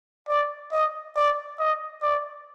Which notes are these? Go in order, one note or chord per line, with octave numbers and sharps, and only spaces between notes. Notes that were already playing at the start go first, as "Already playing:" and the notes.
D5
D#5
D5
D#5
D5